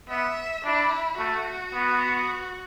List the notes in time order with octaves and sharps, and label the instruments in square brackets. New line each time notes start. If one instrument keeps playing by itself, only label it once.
[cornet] B3 [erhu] E5
[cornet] D4 [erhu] E4
[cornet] A3 [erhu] F#4
[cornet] B3